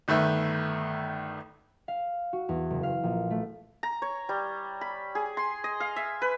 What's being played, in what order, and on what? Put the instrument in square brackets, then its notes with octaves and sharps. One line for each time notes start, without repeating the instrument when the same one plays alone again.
[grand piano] G1 D#3 A3 B4 E5 G6
[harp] F5
F#4
E2
F#1
F5
A#1
A3
[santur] A#5
C#5
G3
B5
G#4
C6
D#5
F5
E5
B4